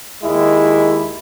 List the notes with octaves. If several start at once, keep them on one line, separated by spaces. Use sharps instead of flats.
D#2 G#3 E4